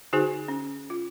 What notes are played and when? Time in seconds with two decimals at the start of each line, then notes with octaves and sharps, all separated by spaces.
0.13 D3 D#4 F#4 G#4 C5 G#5
0.48 C#4
0.90 F4